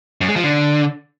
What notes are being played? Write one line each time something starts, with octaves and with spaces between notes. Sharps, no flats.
F#2
G#3
F3
D3